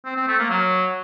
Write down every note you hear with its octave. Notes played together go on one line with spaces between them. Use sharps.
C4
C4
A3
A#3
F#3